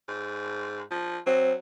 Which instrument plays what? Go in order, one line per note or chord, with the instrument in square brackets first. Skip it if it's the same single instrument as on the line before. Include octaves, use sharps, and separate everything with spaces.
[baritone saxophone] G#2
F3
[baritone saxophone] F#3 [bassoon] C4